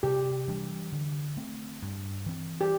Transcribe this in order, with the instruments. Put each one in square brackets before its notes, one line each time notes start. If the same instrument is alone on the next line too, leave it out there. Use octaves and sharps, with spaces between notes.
[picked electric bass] C3 [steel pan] G4
[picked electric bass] E3 G3 D4
D3
A3 C4
G2
E3 C4
[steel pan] G4